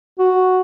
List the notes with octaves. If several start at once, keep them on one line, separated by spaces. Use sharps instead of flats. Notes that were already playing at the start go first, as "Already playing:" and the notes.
F#4